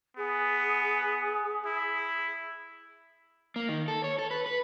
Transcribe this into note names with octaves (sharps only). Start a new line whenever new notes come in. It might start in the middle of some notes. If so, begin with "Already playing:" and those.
B3 G#4
E4
A#3
D#3
A4
C#5
A4
B4
B4